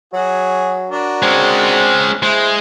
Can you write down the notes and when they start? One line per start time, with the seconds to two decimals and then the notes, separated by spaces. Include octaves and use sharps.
0.13 F#3 F#4 G#4
0.90 D4 F#4 A#4
1.23 G#3 C4 C#4
2.23 G#3 E4 C5